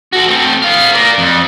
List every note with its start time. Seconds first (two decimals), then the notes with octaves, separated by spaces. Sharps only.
0.13 F#4 A4
0.28 A3 C4
0.62 B3 F5
0.93 A#4 D5
1.18 F2